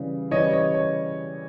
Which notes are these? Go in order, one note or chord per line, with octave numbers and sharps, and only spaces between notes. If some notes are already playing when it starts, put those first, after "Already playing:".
Already playing: C#3 E3 G3
C#3 E3 G3 C#5 D#5
C#5 D#5
C#5